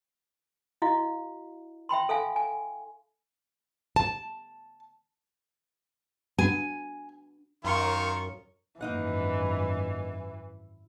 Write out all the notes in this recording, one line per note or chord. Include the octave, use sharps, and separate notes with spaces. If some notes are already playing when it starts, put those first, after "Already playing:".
E4 F#4 D#5 F5
E5 G5 B5 C6
A4 E5 F5 G#5
G#5
A5
D4 F#4 G#5
F#2 D#3 F4 A#4 C#6
G#1 F#2 E3 A#3 D#4 F#5